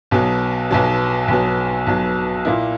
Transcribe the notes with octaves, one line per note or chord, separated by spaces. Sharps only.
B1 B2 F#3
B1 B2 F#3
B1 B2 F#3
B1 B2 F#3
A#2 A#3 E4